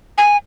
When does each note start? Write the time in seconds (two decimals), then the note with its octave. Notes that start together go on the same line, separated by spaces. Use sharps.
0.18 G#5